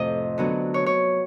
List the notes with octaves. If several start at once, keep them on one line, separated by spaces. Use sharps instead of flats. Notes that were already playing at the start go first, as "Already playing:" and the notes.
Already playing: F2 A2 C3 D#5
D3 F#3 B3
C#5
C#5